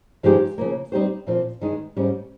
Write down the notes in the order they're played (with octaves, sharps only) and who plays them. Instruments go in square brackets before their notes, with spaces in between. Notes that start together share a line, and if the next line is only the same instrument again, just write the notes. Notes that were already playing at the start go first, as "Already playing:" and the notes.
[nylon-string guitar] G2 F3 G#3 D#4 G4
C#3 F3 A#3
G3 C4 D#4 G4 C5
A#2 F3 C4 F4
G2 D#3 G#3 D#4
G#2 G3 C#4